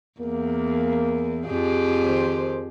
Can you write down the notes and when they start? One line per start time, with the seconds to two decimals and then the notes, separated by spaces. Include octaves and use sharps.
0.20 E2 A#3
1.47 F2 G4 G#4
2.04 D#3 C5